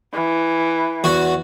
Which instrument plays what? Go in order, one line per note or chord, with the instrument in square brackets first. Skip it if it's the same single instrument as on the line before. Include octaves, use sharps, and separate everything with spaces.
[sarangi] E3
[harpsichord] E2 F#4